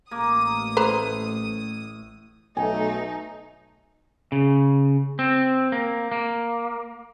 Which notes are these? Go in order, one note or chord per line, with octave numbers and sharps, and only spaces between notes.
A1 A#3 D#6
A2 B4 C5 A#5
B1 A3 D#4 G#5
C#3
C4
A#3
A#3